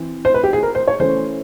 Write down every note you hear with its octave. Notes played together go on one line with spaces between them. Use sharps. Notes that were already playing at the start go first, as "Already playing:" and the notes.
Already playing: E3 C4
C5
B4
G4
G#4
A#4
C5
C#5
E3 A3 C#4 C5